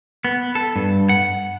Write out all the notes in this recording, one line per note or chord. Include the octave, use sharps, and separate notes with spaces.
B3
A4
G2
F#5